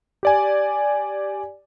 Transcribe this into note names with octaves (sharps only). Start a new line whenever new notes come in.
G4 D5 G#5